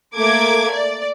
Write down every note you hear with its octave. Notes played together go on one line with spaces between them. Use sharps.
A3 A#3 D6 G#6
D5